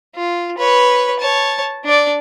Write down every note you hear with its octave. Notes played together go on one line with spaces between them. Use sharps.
F4
B4 C#5
C#5 A5
D4 D5